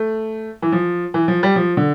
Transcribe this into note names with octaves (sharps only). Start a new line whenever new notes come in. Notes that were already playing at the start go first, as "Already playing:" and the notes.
Already playing: A3
E3
F3
E3
F3
G3
F3
D3